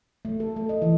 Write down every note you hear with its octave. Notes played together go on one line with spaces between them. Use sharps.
A3
A4
A3
D#5
E3